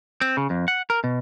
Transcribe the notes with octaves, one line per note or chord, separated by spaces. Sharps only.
C4
C#3
F2
F#5
A#4
B2